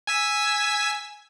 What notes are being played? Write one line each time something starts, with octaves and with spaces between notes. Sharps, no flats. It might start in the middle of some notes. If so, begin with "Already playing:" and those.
G#5 E6 B6